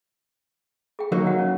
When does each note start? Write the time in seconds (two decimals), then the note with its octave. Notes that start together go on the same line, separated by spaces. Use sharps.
0.99 G#4 G5
1.12 F#3 A#3 D#4 A#4
1.27 F#5
1.39 C#4